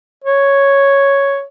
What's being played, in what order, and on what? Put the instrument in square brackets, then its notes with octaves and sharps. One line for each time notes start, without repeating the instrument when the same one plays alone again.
[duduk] C#5